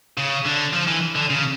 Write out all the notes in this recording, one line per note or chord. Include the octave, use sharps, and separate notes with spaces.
C#3
D3
F3
E3
D3
C#3